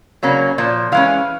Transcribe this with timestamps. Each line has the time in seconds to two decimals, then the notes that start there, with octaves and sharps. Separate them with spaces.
0.23 C#3 F#3 A#3 C#4
0.58 A#2 F3
0.92 E3 G#3 C#4 F5